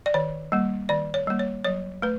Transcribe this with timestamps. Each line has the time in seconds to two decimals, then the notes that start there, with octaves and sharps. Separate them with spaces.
0.06 D5
0.14 D#3 C#5
0.52 G3 A#3
0.89 D#3 D5
1.14 C#5
1.27 G3 A#3
1.39 C#5
1.64 F#3 C#5
2.02 A3 B4